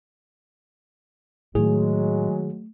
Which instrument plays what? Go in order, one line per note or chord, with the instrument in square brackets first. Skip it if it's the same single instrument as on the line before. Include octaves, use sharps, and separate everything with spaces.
[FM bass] A2 [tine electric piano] D#3 G#4 [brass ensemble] F#3 G#3 [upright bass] A3